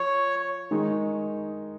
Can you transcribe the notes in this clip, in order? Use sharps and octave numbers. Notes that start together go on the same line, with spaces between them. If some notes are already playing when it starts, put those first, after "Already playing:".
Already playing: F3 C#5
D#3 G#3 D#4